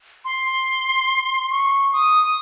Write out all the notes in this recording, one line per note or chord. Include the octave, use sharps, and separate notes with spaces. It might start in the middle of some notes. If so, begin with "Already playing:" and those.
C6
C#6
D#6